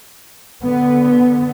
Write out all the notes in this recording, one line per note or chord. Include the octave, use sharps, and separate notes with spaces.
D3 B3